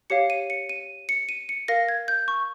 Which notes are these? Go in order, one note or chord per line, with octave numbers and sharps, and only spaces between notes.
G4 C#5 F5 C#7
D#7
C#7
D#7
C#7
D#7
C#7
A#4 F5 A#6
G#6
G6
C#6